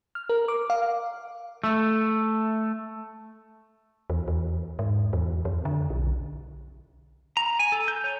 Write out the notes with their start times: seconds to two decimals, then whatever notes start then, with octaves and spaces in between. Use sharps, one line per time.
0.15 F6
0.29 A#4
0.48 D6
0.70 F5
1.64 A3
4.10 E2
4.28 E2
4.79 G#2
5.13 E2
5.45 F2
5.65 D3
5.90 B1
7.37 A#5
7.59 G#5
7.72 A4
7.88 G6
8.04 C#5